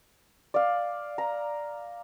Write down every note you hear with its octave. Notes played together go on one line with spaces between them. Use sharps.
D5 F5
A#5